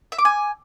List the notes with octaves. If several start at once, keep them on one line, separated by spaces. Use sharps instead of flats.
E5
D6
G#5